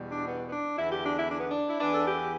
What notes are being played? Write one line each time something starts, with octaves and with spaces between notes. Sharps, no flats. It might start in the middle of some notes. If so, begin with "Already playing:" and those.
Already playing: E2 B2 G3
D4
B3
B3
D4
E2 D3 B3 E4
G4
D4
E4
D4
B3
D4
E4
E2 E3 B3 D4
A4
G4